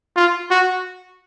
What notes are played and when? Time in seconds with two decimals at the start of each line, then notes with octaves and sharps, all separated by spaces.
0.16 F4
0.51 F#4